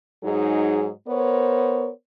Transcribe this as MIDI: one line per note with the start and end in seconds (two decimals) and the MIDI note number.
0.24 0.91 44
0.24 0.91 54
0.24 0.91 63
0.24 0.91 68
1.07 1.89 59
1.07 1.89 70
1.07 1.89 72
1.07 1.89 73